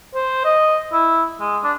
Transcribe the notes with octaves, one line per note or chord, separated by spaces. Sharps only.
C5
D#5
E4
G#3
D4